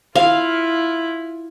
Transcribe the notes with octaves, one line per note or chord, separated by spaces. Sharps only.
E4 F4 F5